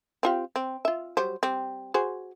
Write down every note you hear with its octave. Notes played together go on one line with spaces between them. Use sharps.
C4 F4 G4
C4
F4 E5
F#3 G3 C5
G3 C4
F#4 G#4 C5